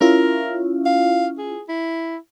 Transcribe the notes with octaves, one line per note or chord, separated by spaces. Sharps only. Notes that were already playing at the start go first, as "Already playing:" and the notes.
C#4 E4 F4 A#4
F5
G#4
E4